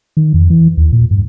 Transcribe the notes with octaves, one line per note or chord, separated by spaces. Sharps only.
D#3
F2
E3
D#2
A#2
G2